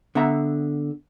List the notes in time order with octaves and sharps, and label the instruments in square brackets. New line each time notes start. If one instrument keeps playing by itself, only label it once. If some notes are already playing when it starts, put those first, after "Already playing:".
[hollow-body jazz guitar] D3 B3 E5 A#5